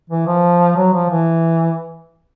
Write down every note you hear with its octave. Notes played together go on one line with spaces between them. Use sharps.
E3
F3
F#3
F3
E3